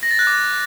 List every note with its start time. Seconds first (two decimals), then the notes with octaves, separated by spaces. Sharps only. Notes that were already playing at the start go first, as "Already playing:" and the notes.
0.03 A#6
0.11 A6
0.19 F#6
0.27 D6